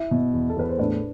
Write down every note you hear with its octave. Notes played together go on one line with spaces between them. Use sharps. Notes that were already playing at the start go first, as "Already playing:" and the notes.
Already playing: E4 E5
B2
E2
A4
E2 B4
C5
A2 D4 D5